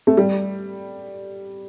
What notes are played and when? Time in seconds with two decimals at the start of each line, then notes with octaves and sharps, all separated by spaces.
0.07 A3
0.17 G3